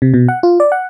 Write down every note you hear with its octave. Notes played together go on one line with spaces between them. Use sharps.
C3
B2
F#5
F4
D5
F#5